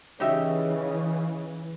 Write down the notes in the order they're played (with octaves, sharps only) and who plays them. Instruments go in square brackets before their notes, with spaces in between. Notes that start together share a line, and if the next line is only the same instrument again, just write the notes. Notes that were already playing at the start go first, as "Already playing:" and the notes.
[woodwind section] C#3 [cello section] E3 [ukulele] D#4 G4 E5